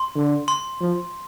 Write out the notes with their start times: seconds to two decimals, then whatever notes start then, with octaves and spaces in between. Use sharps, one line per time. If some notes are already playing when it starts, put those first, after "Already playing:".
Already playing: C6
0.15 D3
0.48 C6
0.81 F3